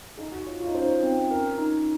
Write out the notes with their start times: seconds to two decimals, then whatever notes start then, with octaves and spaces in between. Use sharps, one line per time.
0.18 D#4 G#4
0.32 F#4
0.46 F4 C#5
0.60 F4
0.67 D#4
0.74 C#4 C5
0.82 D#4
1.03 C4
1.30 C#4 A#4
1.58 D#4